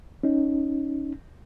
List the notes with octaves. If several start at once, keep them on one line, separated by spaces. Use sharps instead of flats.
C#4 D#4